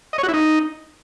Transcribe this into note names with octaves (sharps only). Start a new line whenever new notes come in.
D#5
C#5
F#4
E4
D#4